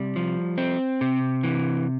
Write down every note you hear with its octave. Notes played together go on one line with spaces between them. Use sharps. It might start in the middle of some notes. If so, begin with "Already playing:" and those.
Already playing: C3 G3
F3
C4
C3
E3